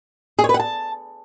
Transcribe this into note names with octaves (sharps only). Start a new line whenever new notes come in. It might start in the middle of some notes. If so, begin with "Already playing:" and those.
G#4
C#5
B4
F#5
A5